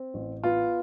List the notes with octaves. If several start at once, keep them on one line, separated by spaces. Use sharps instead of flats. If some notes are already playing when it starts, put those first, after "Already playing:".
Already playing: C4
A1
B3 F4